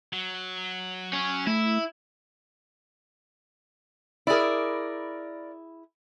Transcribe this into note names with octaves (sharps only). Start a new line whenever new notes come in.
F#3
C#4
A3 E4
E4 G#4 A#4 D5